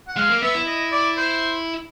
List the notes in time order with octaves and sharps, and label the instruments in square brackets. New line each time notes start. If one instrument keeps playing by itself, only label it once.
[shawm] F#5
[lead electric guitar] G#3 [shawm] F5
[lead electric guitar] A#3
[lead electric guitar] B3 [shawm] E5
[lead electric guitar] E4
[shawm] D#5
D5
C5